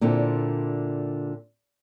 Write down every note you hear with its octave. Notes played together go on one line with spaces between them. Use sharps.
A#2 D3 C4 E4